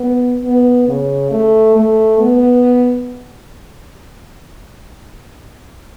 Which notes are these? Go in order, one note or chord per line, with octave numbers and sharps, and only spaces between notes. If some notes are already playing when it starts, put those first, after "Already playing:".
Already playing: B3
B3
C#3
A3
A3
B3